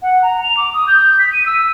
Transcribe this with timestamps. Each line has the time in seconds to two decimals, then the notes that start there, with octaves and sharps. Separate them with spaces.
0.02 F#5
0.22 A#5
0.43 F7
0.57 D6
0.73 D#6
0.87 G6
1.19 B6
1.33 D#7
1.46 E6